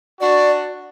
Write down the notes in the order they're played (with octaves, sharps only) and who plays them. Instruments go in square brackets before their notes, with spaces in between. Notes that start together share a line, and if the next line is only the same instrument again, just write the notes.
[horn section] D4 F#4 [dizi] D5